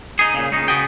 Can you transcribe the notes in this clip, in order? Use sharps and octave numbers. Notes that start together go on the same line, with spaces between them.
D#4 G#4
A#2 C#3
C#2 C#3 D#4
C#3 B3 F#4 G#4 G5